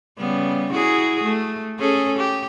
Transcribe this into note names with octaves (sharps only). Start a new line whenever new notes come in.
C#3 G3 B3
E4 F#4 G#4
A3
C#4 G#4 A4
G4